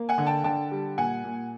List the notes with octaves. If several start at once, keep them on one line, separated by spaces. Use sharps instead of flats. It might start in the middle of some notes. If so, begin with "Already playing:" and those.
Already playing: A#3
F#5 G#5
D3
G5 A5
D3 G5 A5
G3
A#2 F#5 G#5
A#2